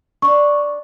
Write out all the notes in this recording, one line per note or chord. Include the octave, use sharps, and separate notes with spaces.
D4 D5 C#6